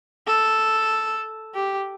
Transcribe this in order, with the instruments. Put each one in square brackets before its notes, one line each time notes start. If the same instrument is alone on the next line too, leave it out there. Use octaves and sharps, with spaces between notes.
[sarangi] A4
G4